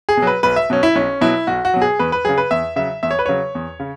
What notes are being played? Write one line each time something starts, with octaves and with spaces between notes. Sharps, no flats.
G#4
B2
F#3 B4
B1 B4
E5
B2 F#3 C#4
E4
B1 C#4
B2 F#3 E4
B1 F#4
F#4
B2 F#3
G#4
E2 B4
B4
C#3 F#3 G#4
B4
E2 E5
C#3 F#3 E5
E2 E5
C#5
B4
C#3 F#3 C#5
E2
C#3